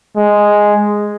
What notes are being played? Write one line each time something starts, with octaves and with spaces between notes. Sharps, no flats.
G#3